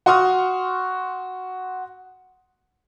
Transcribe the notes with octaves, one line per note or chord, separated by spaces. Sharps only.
F#4 C6 C#6 D#6 F6